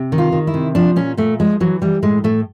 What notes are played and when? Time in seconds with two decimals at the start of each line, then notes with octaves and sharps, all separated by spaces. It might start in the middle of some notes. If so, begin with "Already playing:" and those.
Already playing: C3
0.12 D#3
0.18 F4
0.32 D#3
0.47 E4
0.54 C3
0.75 F3 D4
0.96 A#2 C#4
1.17 A#2 A3
1.40 F3 G#3
1.60 E3 F#3
1.82 E3 G3
2.02 A2 G#3
2.24 A2 A3